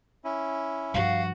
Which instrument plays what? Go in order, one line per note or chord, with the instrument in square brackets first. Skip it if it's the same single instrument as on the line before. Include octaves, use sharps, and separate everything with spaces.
[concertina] C#4 E4
[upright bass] G2 F3 [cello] F#4 [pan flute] F5